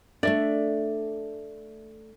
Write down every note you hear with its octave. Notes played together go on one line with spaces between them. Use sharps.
A3 D4 D5 E5